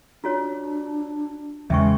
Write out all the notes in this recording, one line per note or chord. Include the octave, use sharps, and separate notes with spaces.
D4 F4 F#4 C#5
E2 C#3 G#3 E5 G5 C#6